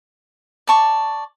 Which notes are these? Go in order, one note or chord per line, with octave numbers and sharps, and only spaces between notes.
D5 A5 C#6